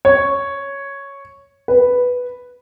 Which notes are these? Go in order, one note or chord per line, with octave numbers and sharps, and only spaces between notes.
C#5
B4